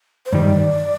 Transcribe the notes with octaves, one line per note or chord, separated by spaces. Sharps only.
C5
G2 D#3 G3 D5